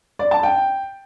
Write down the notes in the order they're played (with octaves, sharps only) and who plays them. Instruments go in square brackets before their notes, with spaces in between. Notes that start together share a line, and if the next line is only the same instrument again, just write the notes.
[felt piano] D5
A5
G5